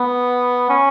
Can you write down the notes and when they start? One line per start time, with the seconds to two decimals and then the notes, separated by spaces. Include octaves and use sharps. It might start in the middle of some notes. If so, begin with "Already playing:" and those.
Already playing: B3
0.70 C#4